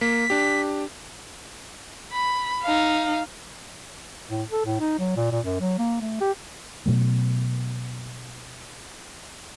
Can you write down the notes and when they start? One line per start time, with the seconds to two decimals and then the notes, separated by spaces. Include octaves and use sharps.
0.01 A#3 B6
0.30 D4 G4
2.12 B5
2.63 D#4 F5
4.30 A2
4.51 A4
4.65 A2
4.80 D#4
4.99 F#3
5.16 A#2
5.31 A#2
5.45 F#2
5.60 F#3
5.78 A#3
6.01 A3
6.21 G4
6.86 B2 F#3 A3